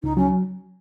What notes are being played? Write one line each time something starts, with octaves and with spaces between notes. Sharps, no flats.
C#2 D#4
F#3 C#4